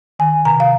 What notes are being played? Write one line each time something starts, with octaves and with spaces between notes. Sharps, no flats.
D#3 G#5
C3 A#5
F5